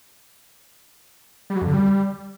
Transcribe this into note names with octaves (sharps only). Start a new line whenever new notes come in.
G3
F#3
F2
D3
G3